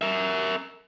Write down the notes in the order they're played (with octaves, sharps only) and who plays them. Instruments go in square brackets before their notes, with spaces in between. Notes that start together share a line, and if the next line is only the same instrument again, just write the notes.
[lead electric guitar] A#4 E5